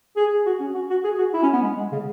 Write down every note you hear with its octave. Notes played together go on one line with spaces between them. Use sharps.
G#4
F#4
C#4
F#4
F#4
G#4
F#4
E4
C#4
B3
G#3
G#3
C#3